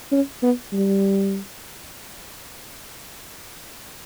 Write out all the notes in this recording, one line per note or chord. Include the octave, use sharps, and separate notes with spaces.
C#4
B3
G3